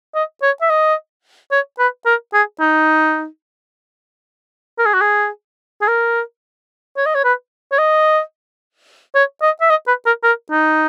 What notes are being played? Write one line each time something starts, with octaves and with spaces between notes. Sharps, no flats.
D#5
C#5
E5
D#5
C#5
B4
A#4
G#4
D#4
A#4
G#4
F#4
G#4
G#4
A#4
C#5
D#5
C#5
B4
C#5
D#5
C#5
D#5
E5
D#5
B4
A#4
A#4
D#4